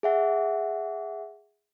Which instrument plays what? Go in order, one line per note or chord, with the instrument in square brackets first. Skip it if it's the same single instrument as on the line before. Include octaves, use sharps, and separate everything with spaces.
[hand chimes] G#4 E5 F#5